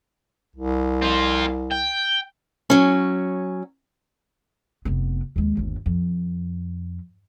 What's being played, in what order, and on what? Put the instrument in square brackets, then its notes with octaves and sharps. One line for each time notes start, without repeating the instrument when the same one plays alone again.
[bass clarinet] C2
[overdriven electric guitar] C4 F4
G5
[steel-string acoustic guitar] F#3 C#4
[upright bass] F1 B3
D#2 G#3
G1 D#2
F2